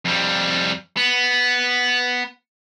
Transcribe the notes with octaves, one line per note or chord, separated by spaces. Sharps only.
F2 G3
B3